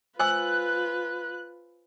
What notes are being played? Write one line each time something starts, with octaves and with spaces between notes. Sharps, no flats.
F4 B4 C5 G#5 E6 F#6